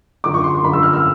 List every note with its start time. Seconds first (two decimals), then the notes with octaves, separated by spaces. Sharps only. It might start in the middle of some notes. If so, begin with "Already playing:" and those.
0.24 F#2 D3 F3 D6
0.34 C#6
0.44 C6
0.55 C6
0.64 F#2 D3 F3 B5
0.73 E6
0.83 F6
0.93 E6